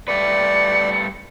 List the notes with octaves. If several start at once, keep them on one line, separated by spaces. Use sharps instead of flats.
G3 A3 B4 D5 C#7